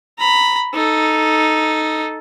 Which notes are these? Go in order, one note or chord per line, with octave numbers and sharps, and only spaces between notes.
A#5 B5
D#4 A4